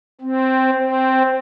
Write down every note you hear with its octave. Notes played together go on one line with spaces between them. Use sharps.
C4
C4